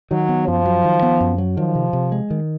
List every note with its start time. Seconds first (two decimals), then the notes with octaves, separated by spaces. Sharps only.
0.11 D#3 F#3
0.29 B3
0.47 F#2 F3
0.65 F#3
0.84 D#3
1.02 B3
1.21 F#2
1.38 F#3
1.57 D#3 F3
1.75 C3
1.93 C3
2.12 G#3
2.30 D#3